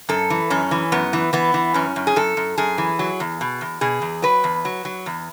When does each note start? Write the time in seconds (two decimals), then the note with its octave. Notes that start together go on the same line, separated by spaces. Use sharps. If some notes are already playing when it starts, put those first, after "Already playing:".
0.09 F#2 A4
0.30 E3
0.50 F#2 C#4
0.71 E3
0.92 F#2 B3
1.13 E3
1.33 E3 B3
1.54 E3
1.74 F#2 C#4
1.96 F#2
2.07 G#4
2.16 F#2 A4
2.37 F#2
2.58 F#2 G#4
2.78 E3
2.99 F#3
3.20 E2
3.41 B2
3.61 E2
3.81 B2 G#4
4.02 E2
4.22 F#3 B4
4.44 E2
4.65 F#3
4.85 F#3
5.06 E2